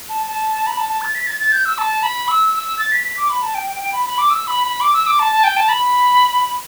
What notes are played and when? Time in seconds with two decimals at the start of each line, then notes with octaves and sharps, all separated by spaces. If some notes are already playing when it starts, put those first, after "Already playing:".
0.09 A5
0.26 A5
0.67 B5
0.77 A5
0.89 A5
1.01 A6
1.15 B6
1.27 A6
1.40 A6
1.52 G6
1.65 E6
1.78 A5
2.03 B5
2.28 E6
2.54 E6
2.79 A6
2.92 B6
3.04 B6
3.17 D6
3.30 B5
3.42 A5
3.55 G5
3.67 G5
3.80 G5
3.93 B5
4.06 B5
4.18 D6
4.30 E6
4.47 B5
4.64 B5
4.81 D6
4.93 E6
5.07 D6
5.19 A5
5.32 A5
5.44 G5
5.57 A5
5.69 B5